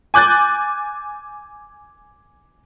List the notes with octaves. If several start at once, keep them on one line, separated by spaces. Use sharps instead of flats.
G#5 D6 F#6 G6 A6